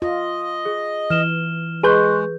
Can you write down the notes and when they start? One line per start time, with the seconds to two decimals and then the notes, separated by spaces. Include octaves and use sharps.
0.02 F4 D#5
0.65 G#4
1.10 E3 F6 E7 G7
1.83 G#3 G#4 B4 C6 C#6 F#6 G6